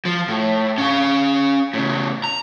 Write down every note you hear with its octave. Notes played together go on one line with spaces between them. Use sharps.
F3
A2
C#4 F5
A2 C#3
A#5